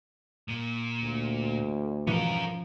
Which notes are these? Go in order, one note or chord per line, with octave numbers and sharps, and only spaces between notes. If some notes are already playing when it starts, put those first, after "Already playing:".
A#2
D2
G#2 B2 E3 F3 C#4 A#4